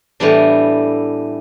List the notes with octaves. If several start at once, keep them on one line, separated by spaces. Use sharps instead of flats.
A2 E3 G3 B3 D4